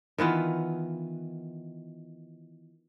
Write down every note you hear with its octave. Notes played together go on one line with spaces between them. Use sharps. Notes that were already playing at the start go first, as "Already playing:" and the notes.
D#3 E3 B3 F4